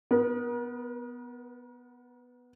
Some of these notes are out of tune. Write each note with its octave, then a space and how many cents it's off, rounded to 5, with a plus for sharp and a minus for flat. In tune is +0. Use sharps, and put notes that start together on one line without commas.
B3 +0 A#4 +40